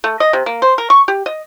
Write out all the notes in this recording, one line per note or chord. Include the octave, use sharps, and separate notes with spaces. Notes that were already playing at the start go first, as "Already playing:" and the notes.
A3
D#5
C3
A#3
C5
A#4
C#6
G4
D#5